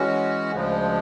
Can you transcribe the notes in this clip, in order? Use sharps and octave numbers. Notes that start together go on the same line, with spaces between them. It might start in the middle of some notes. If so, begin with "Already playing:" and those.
Already playing: E3 G#3 C#4 F#4
D2 C#3 F3 G#3